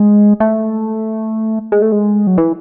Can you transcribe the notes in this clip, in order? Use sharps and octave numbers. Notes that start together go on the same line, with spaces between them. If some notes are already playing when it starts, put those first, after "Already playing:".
Already playing: G#3
A3
G#3
A3
G#3
F#3
E3